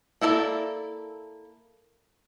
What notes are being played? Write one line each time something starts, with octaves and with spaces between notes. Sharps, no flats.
A#3 E4 A4 C#5 D5